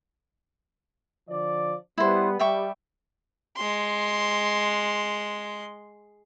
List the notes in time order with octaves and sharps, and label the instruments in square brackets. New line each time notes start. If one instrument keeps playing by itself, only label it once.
[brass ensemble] D3 F3 D5
[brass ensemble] G3 B3 [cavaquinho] E4 C5
[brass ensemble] G3 [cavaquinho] E5 G5 C#6
[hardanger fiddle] G#3 C6